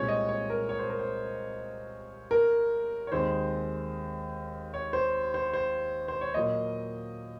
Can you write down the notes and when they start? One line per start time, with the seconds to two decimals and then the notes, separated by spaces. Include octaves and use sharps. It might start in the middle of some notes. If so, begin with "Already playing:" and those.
Already playing: C2 A#2 G#3 C4 C#5
0.08 D#5
0.29 C#5
0.50 A#4
0.69 C#5
0.79 C5
0.90 A#4
0.99 C5
2.31 A#4
3.07 C#5
3.12 D#2 D#3 G#3 C4 C5
4.74 C#5
4.93 C5
5.34 C5
5.54 C5
6.08 C5
6.21 C#5
6.34 A#2 F#3 A#3 D#5